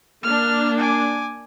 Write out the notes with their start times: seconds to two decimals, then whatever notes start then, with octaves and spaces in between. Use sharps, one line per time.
0.23 A#3 D4 F6
0.78 G#5 D6